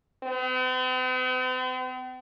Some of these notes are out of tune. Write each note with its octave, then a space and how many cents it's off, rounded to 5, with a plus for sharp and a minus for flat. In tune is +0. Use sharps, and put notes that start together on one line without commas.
C4 -45